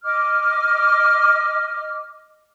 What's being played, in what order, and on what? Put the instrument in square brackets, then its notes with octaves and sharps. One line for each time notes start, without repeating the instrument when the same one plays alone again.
[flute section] D#5 D6 F6